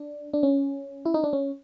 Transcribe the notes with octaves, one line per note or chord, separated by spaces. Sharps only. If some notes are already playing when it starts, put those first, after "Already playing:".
Already playing: D4
D4
C#4
E4
D#4
D4
C#4